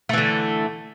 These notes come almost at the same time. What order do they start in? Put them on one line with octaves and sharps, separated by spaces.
A3 E3 D3